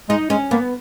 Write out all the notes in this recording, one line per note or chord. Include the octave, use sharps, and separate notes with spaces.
G#3 D#4
G#3 C#4
A#3 B3